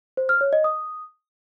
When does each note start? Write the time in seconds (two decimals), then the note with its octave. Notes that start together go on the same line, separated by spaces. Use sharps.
0.17 C5
0.29 F6
0.41 C#5
0.53 D#5
0.64 D#6